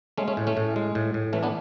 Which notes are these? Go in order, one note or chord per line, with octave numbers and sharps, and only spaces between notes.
G#3 A3 C#4
A3 C#4
A2
A3 C#4
A2
G#3
A2
A2
E3 A3 C#4
B3 D4